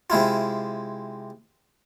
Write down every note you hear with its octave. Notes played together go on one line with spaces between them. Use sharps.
C3 G#3 E4 F4